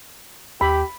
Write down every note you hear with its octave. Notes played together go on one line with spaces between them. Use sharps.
D#2 G4 B5